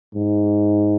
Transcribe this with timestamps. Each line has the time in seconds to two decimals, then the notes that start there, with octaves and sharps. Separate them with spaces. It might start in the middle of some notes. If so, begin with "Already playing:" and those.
0.15 G#2